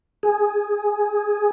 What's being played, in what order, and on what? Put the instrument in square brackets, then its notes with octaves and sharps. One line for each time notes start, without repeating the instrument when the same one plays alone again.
[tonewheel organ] G#4